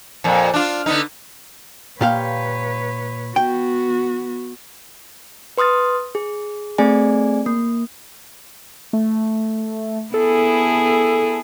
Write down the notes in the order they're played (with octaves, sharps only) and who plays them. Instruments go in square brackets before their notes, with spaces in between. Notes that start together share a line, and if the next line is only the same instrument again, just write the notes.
[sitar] F2 A#2
D4 F4
D3 B3 D#4
[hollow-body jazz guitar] A#2 G4 F5 [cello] B4 C#5
[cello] B3 F#4 [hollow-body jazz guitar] G5
[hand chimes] B4 C6 D#6 F6 A6
G#4
A3 C4 G#4 D5 G#5
A#3
[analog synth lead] A3
[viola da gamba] B3 E4 G#4 [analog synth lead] A4